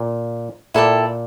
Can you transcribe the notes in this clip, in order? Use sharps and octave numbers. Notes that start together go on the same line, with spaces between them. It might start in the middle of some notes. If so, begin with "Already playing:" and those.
Already playing: A#2
A#2 E4 A4 D5 G5